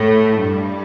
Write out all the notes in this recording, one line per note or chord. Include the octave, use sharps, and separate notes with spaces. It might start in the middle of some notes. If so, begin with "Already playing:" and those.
Already playing: A2 A3
G2 G3